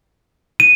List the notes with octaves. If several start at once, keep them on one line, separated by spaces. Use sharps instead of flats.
D#7